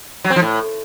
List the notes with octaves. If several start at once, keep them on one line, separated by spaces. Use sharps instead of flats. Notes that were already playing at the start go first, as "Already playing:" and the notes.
F#3
C4
F3
A2